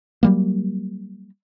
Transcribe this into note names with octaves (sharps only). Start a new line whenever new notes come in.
F#3 G3 A#3